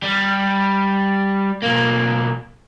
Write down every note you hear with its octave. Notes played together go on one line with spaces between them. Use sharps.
G3
B1 A#3